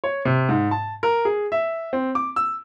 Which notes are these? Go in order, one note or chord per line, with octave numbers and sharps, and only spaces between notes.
C#5
C3
G#2
A5
A#4
G#4
E5
C4
D6
E6